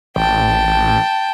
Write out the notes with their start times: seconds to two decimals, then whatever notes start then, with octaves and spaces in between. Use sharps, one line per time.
0.16 A1 G5 A5